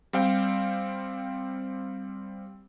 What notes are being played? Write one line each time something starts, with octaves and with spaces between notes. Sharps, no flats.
G3 C4 F5 G5